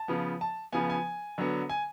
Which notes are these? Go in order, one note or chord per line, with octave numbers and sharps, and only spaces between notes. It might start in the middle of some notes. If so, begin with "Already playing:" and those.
Already playing: A5
C#3 F3 B3
A5
C#3 F3 B3 G#5
G#5
D3 F#3 B3
G#5